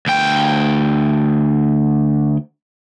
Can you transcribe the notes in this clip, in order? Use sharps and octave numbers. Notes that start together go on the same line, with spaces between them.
D2 G5